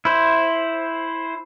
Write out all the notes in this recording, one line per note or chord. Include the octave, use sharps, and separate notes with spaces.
E4 C5